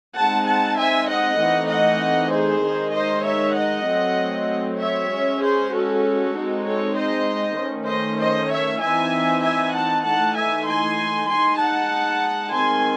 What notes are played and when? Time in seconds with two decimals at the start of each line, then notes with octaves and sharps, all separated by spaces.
0.17 G#3 C4 D#4 F#5 A5
0.47 F#5 A5
0.78 E5 G#5
1.09 D#5 F#5
1.40 E3 A3 C4 D#4
1.70 D#5 F#5
2.32 G#4 C5
2.64 D#3 G#3 D#4
2.94 C5 D#5
3.25 C#5 E5
3.56 D#5 F#5
3.87 F#3 A3 C4
4.80 C#5 E5
5.11 G#3 C#4
5.41 G#4 C5
5.73 F#4 A4
6.35 G#3 C4 D#4
6.65 A4 C#5
6.96 C5 D#5
7.58 D#3 A3 C#4
7.88 C5 D#5
8.20 C5 D#5
8.50 C#5 E5
8.82 E3 C4 D#4 E5 G#5
9.43 E5 G#5
9.75 F#5 A5
10.05 E3 A3 D#4 F#5 A5
10.36 E5 G#5
10.67 G#5 C6
11.29 G#3 D#4 G#5 C6
11.60 F#5 A5
12.52 D#3 G#3 C4 G#5 C6